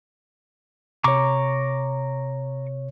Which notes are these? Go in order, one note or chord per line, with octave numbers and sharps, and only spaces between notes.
C3 C#5 A#5 C#6 D6